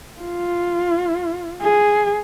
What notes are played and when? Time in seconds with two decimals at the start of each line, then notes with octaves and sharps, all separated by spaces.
0.21 F4
1.61 G#4